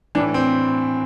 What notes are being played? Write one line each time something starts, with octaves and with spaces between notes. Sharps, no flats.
A2 E3 D4
C4